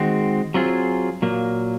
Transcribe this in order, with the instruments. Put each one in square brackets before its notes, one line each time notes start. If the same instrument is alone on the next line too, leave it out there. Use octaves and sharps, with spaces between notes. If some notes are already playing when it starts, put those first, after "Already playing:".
Already playing: [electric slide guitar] D#3 G#3 C4 F#4
F#3 C4 F4 G#4
A#2 F#3 A#3